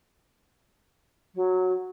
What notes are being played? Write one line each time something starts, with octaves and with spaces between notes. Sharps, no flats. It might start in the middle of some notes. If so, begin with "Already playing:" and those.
F#3